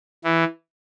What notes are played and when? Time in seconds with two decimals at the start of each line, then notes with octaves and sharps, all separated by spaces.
0.24 E3